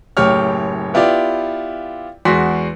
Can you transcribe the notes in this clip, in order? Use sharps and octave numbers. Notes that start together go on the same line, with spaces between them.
F#1 A2 G4 C#5 F6
B3 E4 F4 G4 D5
E2 G#3 F#4 C6 B6